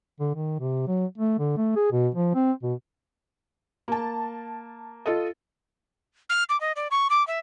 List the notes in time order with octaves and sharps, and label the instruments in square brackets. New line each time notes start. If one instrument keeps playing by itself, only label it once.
[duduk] D3
D#3
C3
F#3
A3
D3
A3
G#4
B2
F3
C4
B2
[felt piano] A#3 A5
F4 A4 D#5
[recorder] F6
D6
D#5
D5
C#6
D6
E5